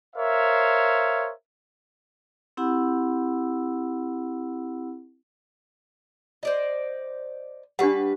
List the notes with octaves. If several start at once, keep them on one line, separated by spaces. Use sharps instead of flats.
A#4 C5 C#5 E5 F5
C4 E4 G4 F#5 B5 E6
C5 D5 D#5
G3 D4 G4 B4 F#5